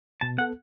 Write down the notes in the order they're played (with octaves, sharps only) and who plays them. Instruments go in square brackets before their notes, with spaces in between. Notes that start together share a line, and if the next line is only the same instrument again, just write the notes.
[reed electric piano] B2 [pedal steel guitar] A5
[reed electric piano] B3 A4 [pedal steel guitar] F#5